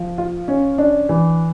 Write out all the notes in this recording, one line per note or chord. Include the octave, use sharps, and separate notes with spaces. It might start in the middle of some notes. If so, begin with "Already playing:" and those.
Already playing: F3
F4
C#4
D4
E3